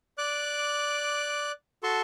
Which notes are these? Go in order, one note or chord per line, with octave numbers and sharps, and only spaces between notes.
D5 D6 F#6
F#4 A4 A5 C6 C#6